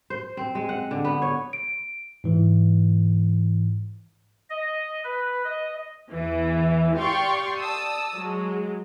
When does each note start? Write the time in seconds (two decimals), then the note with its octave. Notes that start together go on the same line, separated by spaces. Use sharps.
0.10 C5
0.37 C4
0.55 G#3
0.69 F#5
0.91 D3
1.04 B3
1.22 C#5
1.53 D7
2.24 G#2 E3
4.50 D#5
5.04 B4
5.44 D#5
6.10 E2 E3
6.95 G4 D5 F5 G5 C6 C#6
7.59 D5 A5 D#6 E6
8.15 F#3 G#3